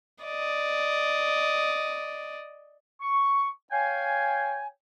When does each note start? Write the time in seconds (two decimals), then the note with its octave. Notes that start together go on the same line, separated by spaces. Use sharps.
0.24 D5 D#5
3.01 C#6
3.72 C#5 F5 G5 G#5